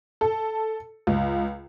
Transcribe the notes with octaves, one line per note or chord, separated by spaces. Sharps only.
A4
C#2